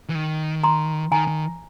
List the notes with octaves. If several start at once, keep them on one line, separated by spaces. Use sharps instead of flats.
E3
D#3
A#5 C6
D#3 G#5 A#5
D#3